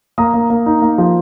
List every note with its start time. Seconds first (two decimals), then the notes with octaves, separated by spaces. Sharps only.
0.18 A#3 A#5 D#6
0.34 A#3
0.50 A#3
0.66 D#4
0.82 A#3
0.98 F3